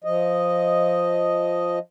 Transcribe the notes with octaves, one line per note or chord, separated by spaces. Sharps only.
F3 D#5